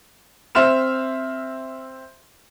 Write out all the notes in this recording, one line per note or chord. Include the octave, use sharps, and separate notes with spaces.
C4 E5 C6 F6 E7